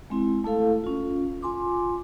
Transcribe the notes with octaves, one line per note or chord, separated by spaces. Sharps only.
G#3 C4 E4
A3 E4 A4 F5
C#4 F4
F4 G#5 C6 D6